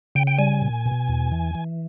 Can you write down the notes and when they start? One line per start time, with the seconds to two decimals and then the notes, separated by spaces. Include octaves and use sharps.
0.15 C#3 G5
0.27 G5
0.38 G3 G#5
0.62 A#2
0.85 B2
1.09 E2
1.32 E3
1.55 E3